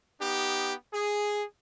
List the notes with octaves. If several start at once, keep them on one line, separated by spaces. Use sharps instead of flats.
B3 D#4 G4
G#4